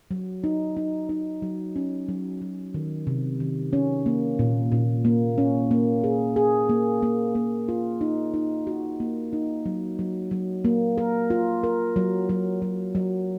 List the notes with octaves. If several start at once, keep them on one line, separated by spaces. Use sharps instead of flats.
F#3
D#4
D#4
D#4
F#3
C#4
F#3
F#3
D#3
C3
D#3
C#4
A#3
A#2
A#2
A#3
C#4
A#3
G#4
G#4
A#3
A#3
A#3
F4
D#4
D#4
F#4
A#3
D#4
F#3
F#3
F#3
A#3
A#4
F4
A#4
F#3
F#3
F#3
F#3